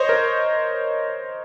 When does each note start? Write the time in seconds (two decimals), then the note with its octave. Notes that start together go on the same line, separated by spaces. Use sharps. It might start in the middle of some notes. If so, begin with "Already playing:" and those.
Already playing: C5 C#5 D#5
0.09 A#4